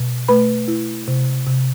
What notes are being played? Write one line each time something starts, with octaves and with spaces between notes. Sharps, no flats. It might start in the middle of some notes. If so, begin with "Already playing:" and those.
Already playing: B2
A3 B4 B5
E4
C3
C3